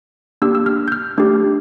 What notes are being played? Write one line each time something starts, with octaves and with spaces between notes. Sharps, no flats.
A#3 D4 G4 E6
E6
F6
G6
F6
A3 D4 G4